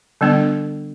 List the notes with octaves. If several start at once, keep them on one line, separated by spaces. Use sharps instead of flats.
D3 G3 B3 D4